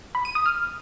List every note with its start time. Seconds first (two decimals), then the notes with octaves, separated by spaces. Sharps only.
0.15 B5
0.25 D#7
0.35 D#6
0.46 F6